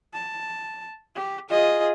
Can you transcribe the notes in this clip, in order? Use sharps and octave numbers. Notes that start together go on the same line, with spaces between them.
A5
G4
F4 G#4 D#5